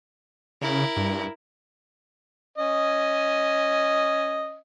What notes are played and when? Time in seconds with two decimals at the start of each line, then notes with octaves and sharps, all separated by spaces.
0.62 C#3 E4 A#4
0.97 G2
2.58 C#4 D#5